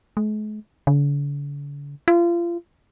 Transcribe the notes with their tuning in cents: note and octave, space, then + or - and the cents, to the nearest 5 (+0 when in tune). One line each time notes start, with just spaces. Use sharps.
G#3 +45
D3 -45
F4 -30